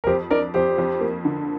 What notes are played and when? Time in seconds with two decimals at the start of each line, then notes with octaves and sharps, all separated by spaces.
0.04 A#4
0.07 F2 G4 C5
0.31 D4 A#4 D5
0.54 F2 G4 C5
0.78 F2
1.01 A#3
1.25 D3